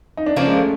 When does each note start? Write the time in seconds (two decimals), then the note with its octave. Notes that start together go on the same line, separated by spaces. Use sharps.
0.17 D#4
0.26 D4
0.36 F3 A#3 C#4 D4
0.47 G#3
0.56 A3